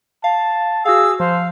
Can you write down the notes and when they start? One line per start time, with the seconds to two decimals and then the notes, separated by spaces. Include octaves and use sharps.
0.24 F5 A5
0.85 F#4 G#4 F5 E6
1.20 F3 C5 F5